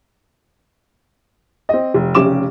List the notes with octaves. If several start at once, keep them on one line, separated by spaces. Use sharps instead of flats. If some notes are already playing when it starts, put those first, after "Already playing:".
C4 D#5
F1
F1 C#3 C#4 G4 D6 E7